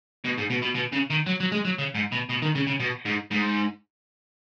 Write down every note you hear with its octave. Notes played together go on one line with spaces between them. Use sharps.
B2
G#2
B2
B2
B2
C#3
D#3
F#3
F#3
G#3
F#3
C#3
G#2
B2
B2
D#3
C#3
C#3
B2
G#2
G#2